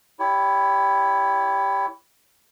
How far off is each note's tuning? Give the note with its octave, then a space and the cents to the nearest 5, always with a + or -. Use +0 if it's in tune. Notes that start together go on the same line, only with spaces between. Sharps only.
E4 +0 G4 +0 C#5 +35